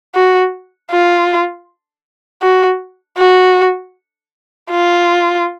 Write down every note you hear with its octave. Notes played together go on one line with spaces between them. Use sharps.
F#4
F4
F#4
F#4
F4